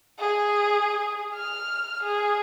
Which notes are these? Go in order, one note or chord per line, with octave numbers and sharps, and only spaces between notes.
G#4
F6
G#4